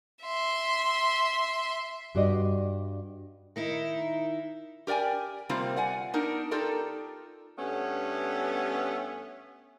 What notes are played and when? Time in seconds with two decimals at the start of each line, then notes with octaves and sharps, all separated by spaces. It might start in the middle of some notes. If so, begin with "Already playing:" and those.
0.24 E5 C6
2.15 G2 F#4 G4 D5 D#5
3.56 D#3 D#4 E4
4.87 G4 A#4 D5 G5 G#5
5.49 C3 G3 A#3 C4 F4
5.76 D5 F#5 G#5
6.14 B3 D4 D#4 A#4
6.51 D#4 F4 G4 A4 A#4 D5
7.58 G2 A3 B3 C#4